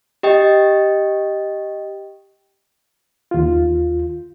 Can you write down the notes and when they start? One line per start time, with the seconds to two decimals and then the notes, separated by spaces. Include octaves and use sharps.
0.23 G4 D#5 G5
3.31 D#2 F4